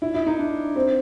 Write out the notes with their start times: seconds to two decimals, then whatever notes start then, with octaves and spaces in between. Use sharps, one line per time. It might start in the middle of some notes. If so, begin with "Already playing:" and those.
0.02 E4
0.14 E4
0.26 D#4
0.39 D4
0.76 C4